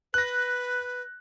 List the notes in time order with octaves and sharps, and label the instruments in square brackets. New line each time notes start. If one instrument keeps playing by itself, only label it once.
[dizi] B4 [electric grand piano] F#6 A#6